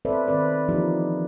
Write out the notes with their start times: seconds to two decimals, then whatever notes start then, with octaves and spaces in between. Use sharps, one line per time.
0.05 C4 A4 B4 C5 D5 E5
0.27 D#3 C4 B4 D5
0.68 E3 F3 A#3 D#4 G4